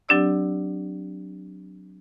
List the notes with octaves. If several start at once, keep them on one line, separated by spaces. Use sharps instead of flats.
F#3 C4 D4 G4 D5 E6